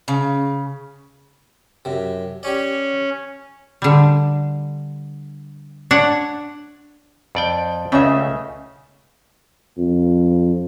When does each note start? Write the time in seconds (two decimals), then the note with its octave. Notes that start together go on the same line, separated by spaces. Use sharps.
0.08 C#3
1.85 F#2 C3
2.43 C#4 G4 C#5 D5
3.82 D3 G3
5.91 D4 C#5 F#5
7.35 F2 D5 G5
7.92 C#2 C#3 A3 C#4 D#5 E5
9.78 F2